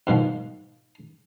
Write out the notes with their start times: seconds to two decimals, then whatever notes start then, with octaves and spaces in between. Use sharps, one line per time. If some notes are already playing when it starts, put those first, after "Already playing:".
0.07 G#2 B2 D#3 F3